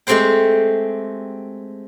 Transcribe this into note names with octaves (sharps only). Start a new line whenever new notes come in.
G#3 A3 C4 G4 C5 G5